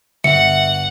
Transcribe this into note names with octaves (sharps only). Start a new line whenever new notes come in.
G1 E5 F#5 C#7